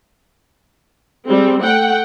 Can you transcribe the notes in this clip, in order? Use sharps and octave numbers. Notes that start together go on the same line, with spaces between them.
G3 G#3 C4
A3 F#5 G5